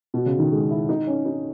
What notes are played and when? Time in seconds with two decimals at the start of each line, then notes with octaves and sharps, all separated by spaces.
0.14 B2
0.26 C#3
0.39 D#3
0.52 G#3
0.71 E4
0.89 D#4
1.07 C#4
1.25 D#4